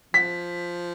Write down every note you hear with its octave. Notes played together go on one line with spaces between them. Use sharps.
F3 B6